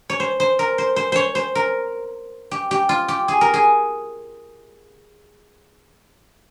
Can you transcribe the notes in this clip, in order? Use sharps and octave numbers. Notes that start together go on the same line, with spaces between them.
C#5
C5
C5
A#4
C5
C5
C5 C#5
C5
A#4
G4
G4
F4
G4
G#4
A#4
G#4